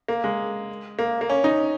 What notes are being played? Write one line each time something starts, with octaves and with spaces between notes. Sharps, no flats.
A#3
G#3
A#3
A#3
C#4
D#4